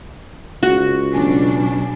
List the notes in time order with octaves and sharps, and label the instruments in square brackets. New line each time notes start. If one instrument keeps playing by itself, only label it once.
[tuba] C#2 [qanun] F#4
[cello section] B2 F#3 D4 [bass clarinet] C#4